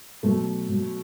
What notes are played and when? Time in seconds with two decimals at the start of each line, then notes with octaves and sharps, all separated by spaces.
0.23 B2 F#3 A3
0.69 B2 F#3